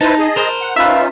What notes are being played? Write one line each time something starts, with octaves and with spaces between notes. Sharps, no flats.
D#4 E4 B4 C5 A5
G#4 D#5
A#4 C5
F#5
C#4 D#4 F4 B4 E5 F5